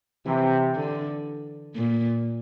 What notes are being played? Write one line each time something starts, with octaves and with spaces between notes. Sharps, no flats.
C3 E3
D3
A#2